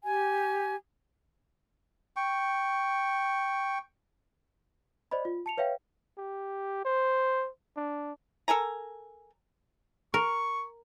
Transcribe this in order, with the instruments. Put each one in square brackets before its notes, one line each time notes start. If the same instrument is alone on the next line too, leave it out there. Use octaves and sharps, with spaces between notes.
[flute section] G4 G#5
[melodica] G5 C#6
[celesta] C5 D5 D#5 B5
F4
A5 C#7 F7
B4 C#5 E5 F5 G5
[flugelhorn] G4
C5
D4
[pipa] A4 A#4 G#5 A#5
[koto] A#4 [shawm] C#6